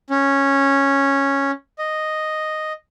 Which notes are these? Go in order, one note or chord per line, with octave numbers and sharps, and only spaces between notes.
C#4
D#5